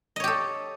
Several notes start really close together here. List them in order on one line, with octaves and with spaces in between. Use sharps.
D#5 C#5 G4 A4